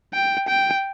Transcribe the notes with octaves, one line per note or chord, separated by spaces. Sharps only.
G5
G5